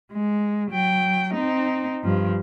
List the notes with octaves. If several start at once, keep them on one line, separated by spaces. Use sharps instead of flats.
G#3
F#3 G5
C4 D#4
G2 F3